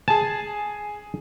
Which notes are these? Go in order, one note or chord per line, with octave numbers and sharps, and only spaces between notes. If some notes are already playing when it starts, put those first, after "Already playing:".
G#4 G#5 A5